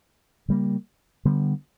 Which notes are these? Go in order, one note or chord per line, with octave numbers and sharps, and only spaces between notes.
C#3 G3 A#3
D3 G3 B3